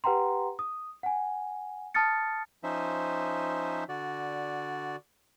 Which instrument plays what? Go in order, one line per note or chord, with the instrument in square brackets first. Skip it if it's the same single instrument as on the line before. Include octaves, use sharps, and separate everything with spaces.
[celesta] G4 B4 F#5 G5 A#5 C6
D#6
F#5 G#5
A5 D#6 F6 A6 C#7
[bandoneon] F3 C#4 D#4 C5 E5
D3 F#4 D5